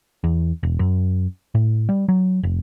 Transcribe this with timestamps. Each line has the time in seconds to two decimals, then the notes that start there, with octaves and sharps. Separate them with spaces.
0.24 E2
0.63 E1
0.79 F#2
1.55 A2
1.89 G3
2.09 F#3
2.43 F1